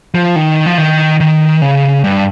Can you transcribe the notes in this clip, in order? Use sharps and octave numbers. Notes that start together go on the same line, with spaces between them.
F3
D#3
F3
D#3
D#3
C#3
G2